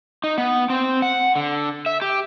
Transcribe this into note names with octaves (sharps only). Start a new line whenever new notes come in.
D#4
B3
C4
F#5
D3
E5
G4